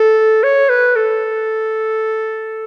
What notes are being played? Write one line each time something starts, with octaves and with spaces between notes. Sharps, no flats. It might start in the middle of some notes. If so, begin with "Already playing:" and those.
Already playing: A4
C#5
B4
A4